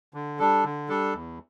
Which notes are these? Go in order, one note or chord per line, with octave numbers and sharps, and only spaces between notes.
D3
G3 D4 A4
D3
G3 D4 A4
E2